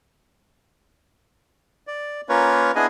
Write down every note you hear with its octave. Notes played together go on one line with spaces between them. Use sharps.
D5
A#3 C#4 F4 A#4 B4 C#5
B3 D4 E4 G#4 D#5 G#5